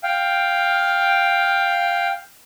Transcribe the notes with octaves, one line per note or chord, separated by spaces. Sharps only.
F5 G5